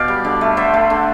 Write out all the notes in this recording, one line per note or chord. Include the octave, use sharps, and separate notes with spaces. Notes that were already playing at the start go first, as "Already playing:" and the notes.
Already playing: B2 G4 D5 F5
G3
D3
A3
D3 C5 E5
A3
D3